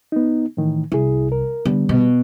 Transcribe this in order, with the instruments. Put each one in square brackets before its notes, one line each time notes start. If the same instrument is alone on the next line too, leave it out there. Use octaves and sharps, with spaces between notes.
[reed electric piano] B3 D#4
A2 D#3 E3
[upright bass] C2 [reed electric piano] E4 G#4
[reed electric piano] A#4
[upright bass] D3 [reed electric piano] G3 B3
[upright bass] B2